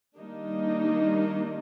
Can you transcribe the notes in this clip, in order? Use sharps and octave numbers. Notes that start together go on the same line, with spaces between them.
D#3 G3 A#3 D4 D#4